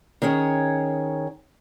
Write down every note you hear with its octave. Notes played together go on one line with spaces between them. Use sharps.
D#3 C#4 G#4 C#5 G5